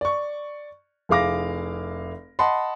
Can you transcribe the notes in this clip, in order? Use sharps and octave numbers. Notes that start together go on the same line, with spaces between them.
D5 C#6
F1 E4 G#4 F5 D6 A#6
D#5 F#5 A5 B5 C6